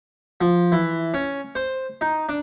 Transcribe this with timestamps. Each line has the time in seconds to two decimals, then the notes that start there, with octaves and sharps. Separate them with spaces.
0.41 F3
0.72 E3
1.14 C#4
1.55 C5
2.01 D#4
2.29 D4